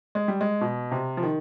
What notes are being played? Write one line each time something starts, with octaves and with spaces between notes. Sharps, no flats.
G#3
G3
G#3
B2
C3
F3
D#3